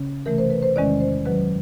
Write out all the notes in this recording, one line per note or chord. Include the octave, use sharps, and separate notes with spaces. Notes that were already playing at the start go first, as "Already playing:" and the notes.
Already playing: C#3 C#4
C3 E3 A3 A#4
C5
B4
C5
E2 C3 D#3 G#3 C#4 D5
C5
F#2 D#3 F#3 B4